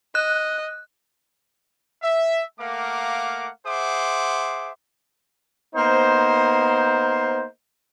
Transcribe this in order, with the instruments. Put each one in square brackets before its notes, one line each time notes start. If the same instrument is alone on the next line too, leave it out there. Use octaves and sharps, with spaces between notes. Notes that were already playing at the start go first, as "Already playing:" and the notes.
[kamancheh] D#5 [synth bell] F#6
[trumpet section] E5
A3 A#3 A#4 F5 F#5 D6
G#4 C5 E5 F#5 C6 D6
[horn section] A#3 B3 D#4 C5